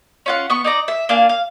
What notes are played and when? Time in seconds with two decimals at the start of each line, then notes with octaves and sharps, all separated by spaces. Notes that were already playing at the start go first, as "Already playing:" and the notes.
0.26 C#4 F4 F#5
0.50 B3 C#6
0.64 D#4 D5 A#5
0.88 E5
1.09 A#3 D4 F5 G#5
1.29 F5